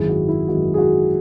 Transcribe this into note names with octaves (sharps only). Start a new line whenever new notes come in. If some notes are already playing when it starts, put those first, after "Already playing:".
Already playing: G#1 F#2 D#3 G#3 E4 G#4
F#4
E4
G#1 F#2 D#3 G#3 F#4
G#4
F#4